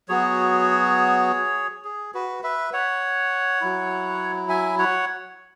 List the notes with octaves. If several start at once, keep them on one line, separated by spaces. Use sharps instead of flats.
F#3 B3 F#4 G#4 C#5
G#4
F#4 B4
B4 E5
C#5 F#5
F#3 E4
E5 G#5
C#5 F#5